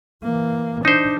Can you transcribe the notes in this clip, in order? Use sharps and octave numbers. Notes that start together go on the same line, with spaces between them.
E3 A#3
D4 D#4 C5